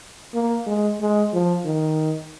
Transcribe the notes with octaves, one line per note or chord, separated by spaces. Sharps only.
A#3
G#3
G#3
F3
D#3